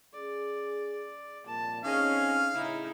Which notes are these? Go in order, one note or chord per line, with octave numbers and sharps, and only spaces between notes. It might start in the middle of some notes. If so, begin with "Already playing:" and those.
C#4 G#4 D5
C2 F2 A#2 A5
D3 C4 C#4 D#4 G#4 D#5 F5
A2 C#3 D#4 E4